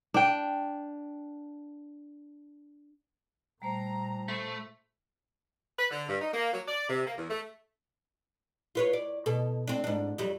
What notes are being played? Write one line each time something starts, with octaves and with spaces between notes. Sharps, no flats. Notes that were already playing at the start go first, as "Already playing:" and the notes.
D4 G5
A#2 G3 A3 C5 A#5
A3 C5 B5 C6
B4
D3
G2
D#4
A#3
F#3
D5
C3
A#3
E2
A3
F4 B4 C#5
D5
B2 A4
C4 D4
G#2 D4
F2 F#3 G3